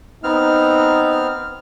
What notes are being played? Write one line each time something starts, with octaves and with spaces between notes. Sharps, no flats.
B3 C4 D#4 F6